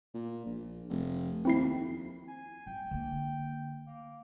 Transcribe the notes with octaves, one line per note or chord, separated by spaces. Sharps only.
A#2
A#1
F1
D#2 C4 E4 C7
F2
G#5
F#3 G5
D3 A#3
A#3